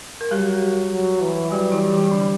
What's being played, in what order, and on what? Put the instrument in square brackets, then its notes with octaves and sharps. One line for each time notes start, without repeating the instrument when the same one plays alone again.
[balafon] A#4
[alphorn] F#3 [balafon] G3 G4
[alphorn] F#3
E3
[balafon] F#3 F#4 [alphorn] G3
[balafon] E3 E4
E3 E4
D3 D4